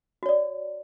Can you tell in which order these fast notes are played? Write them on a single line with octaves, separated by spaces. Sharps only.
F#4 C#5 D5